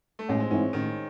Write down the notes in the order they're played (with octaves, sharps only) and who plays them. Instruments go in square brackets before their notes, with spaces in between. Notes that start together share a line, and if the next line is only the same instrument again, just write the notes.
[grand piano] A3
[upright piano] A1 [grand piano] G#3
[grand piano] C4
[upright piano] G#2 E3 C4 [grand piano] C#4
[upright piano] A1 [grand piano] D#3